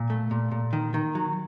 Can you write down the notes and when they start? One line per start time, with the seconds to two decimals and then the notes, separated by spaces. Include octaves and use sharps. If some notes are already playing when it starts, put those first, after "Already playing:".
Already playing: A#2
0.10 A3
0.31 A#2
0.51 A#2
0.73 D#3
0.94 D#3
1.15 F#3